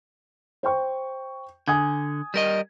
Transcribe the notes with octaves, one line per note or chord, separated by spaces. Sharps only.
C5 G5 C#6
D3 G#5 D#6 G#6
G3 A#4 D#5